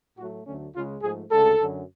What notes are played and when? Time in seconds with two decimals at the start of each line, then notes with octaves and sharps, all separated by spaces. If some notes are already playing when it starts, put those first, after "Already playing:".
0.18 A2 F#3 A3 F#4
0.46 D2 D3 F#3 A3 C#4
0.75 C#2 C#3 G#3 F4
1.03 G#2 F3 A3 G#4
1.31 D2 C#3 G#3 A4
1.59 F#2 D3 F#3